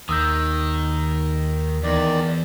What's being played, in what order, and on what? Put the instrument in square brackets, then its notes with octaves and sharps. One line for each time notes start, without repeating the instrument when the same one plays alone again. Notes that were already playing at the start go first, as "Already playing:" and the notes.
[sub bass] D#2 [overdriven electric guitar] D#3 [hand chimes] D#6 E6 G6
[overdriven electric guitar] E2 [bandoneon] D#3 D5